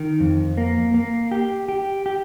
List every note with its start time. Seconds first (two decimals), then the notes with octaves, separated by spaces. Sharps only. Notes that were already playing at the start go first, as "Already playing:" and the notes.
Already playing: D#3
0.20 F2
0.58 A#3
0.94 A#3
1.31 G4
1.68 G4
2.06 G4